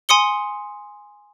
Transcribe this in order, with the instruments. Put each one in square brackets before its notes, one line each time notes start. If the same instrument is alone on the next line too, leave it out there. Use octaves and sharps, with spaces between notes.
[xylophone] G#5 C6 D#6 C#7 G7